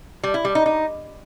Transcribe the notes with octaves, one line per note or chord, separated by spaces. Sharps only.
G3
E4
G3
D#4
D#4